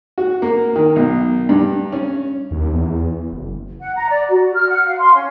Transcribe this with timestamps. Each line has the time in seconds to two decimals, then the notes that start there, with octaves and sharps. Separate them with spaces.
0.18 F#4
0.42 A#3
0.76 D#3
0.96 B1
1.49 G2
1.92 C#4
2.51 D#2
2.73 E2
3.31 F#1
3.80 F#5
3.95 A#5
4.09 D5
4.29 F#4
4.54 F6
4.69 F#5
4.85 F5
4.99 C6
5.14 C#4